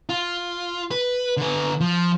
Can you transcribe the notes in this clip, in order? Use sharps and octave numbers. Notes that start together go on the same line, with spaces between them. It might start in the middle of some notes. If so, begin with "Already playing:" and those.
F4
B4
D3 B4
F3